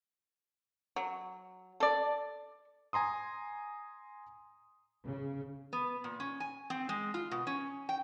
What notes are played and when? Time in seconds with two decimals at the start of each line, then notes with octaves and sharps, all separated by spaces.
0.96 F#3
1.80 A4 D5
2.93 G#5 A#5 C6 D#6
5.05 C#3
5.73 B3
6.04 A#2
6.20 C#4
6.40 G#5
6.70 C4
6.89 G#3
7.14 F4
7.31 B2
7.47 C#4
7.89 G5